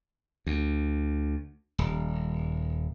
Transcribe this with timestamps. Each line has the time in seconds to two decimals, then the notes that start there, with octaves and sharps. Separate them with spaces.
0.47 D2
1.78 D#1